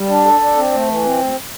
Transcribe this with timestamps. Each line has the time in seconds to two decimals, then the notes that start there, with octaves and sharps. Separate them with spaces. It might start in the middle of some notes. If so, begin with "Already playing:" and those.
Already playing: G3
0.09 D4
0.25 A4
0.41 D4
0.57 C4
0.72 A3
0.88 E3
1.04 C4
1.19 D2